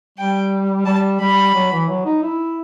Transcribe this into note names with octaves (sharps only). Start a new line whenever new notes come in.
G3 G5
G3 A5
G3 B5
F#3
E3
F#3
D#4
E4